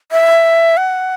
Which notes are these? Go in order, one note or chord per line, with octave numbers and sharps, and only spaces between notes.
E5
F#5